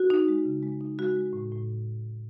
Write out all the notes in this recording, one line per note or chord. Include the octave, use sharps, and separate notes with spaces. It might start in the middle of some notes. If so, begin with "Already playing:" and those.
Already playing: F#4
D#4
G#3
C#3
G#3
D#4
G#3 F#4
G#3
A2
A2